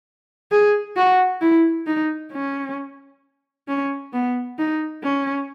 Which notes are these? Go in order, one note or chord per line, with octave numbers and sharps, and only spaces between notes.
G#4
F#4
E4
D#4
C#4
C#4
B3
D#4
C#4